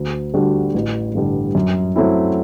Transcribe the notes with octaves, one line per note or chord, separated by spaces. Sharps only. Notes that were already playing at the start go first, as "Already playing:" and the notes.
Already playing: D2
D3 G3 D4 F#4
A1
G2 D3 G3
F#2
F#3 A3 C4 E4